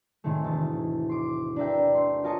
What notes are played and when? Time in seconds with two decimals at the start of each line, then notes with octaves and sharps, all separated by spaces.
0.24 A2 C3 D#3 G#3 A3
0.44 E1 A6
1.09 C6 D6
1.56 D4 A#4 B4 E5 G5
1.94 A3 C6
2.24 F4 A#4 C#5 D#5 A5